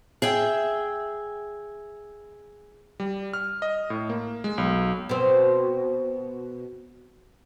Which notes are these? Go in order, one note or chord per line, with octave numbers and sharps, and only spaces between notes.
G#4 E5 G5
G3
F6
D#5
A2
A#3
G#3
B1
B2 C4